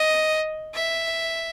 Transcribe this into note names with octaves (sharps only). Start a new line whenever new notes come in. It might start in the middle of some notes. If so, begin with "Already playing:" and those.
Already playing: D#5
E5